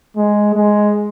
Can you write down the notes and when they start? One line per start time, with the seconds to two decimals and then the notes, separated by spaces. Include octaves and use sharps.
0.17 G#3
0.54 G#3